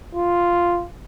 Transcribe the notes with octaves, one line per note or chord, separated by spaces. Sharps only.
F4